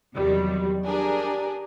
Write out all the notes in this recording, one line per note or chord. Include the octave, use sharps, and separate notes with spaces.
E2 C3 D#3 F#3 G3
D4 G4 G#4 A#4